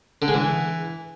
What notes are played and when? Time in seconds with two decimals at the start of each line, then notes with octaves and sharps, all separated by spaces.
0.22 D3
0.28 G#3
0.34 E3